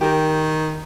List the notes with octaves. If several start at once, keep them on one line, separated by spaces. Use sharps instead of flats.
D#3 G4 A#4